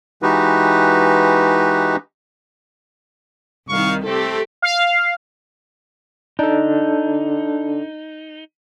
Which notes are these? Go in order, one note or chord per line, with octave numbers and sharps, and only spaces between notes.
E3 G#3 D#4 F#4 G4 B4
C2 D#3 F5 C#6
A3 C4 G4 A4
F5
D4 D#4 A4